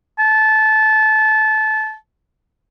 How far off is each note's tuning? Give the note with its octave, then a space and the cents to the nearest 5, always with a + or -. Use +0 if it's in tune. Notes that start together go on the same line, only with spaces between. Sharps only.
A5 -20